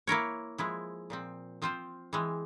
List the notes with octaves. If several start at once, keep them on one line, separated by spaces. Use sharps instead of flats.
A#3 E4 A#4 C#5
F3 G#3 E4
A#2 F3 C4
F3 C4 F4 C5
E3 G#3 C4